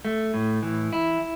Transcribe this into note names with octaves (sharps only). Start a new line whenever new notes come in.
A3
A2
E3
E4